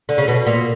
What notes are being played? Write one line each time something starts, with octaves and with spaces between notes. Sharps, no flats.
D3
C#3
B2
A#2